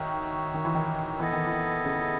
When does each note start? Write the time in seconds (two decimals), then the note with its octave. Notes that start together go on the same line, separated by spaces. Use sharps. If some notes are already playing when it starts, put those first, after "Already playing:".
Already playing: D#3 D#4 F#4 C#5 E5
0.54 D#3
0.65 E3
0.75 D#3
1.19 E3 B3 E4 A4 D#5
1.33 D#3
1.47 E3
1.84 C#3